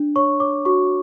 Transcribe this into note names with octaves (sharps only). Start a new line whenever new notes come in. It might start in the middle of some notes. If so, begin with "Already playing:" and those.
Already playing: D4
C#5 C#6
C#5 D6
F#4 C#6